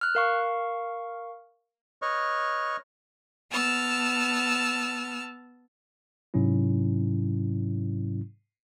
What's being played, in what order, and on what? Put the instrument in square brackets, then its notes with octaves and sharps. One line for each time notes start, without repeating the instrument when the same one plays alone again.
[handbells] F6 F#6
A#4 F5 C#6
[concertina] B4 C#5 D#5 C#6 F6
[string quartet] B3 A5 E6 F6
[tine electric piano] G#2 C3 F#3 C#4 E4